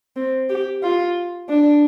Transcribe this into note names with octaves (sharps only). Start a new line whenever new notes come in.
C4
G4
F4
D4